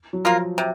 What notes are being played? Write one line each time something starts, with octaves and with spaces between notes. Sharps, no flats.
F#3
F3 A#3 F4 A#4
C3